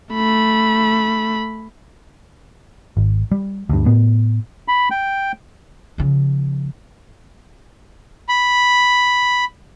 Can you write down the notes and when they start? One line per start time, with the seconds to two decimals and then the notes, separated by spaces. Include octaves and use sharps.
0.14 A3 B5
2.97 G#1
3.31 G3
3.69 D2 G2
3.86 A2 B3
4.68 B5
4.91 G5
5.98 C#3 F3
8.29 B5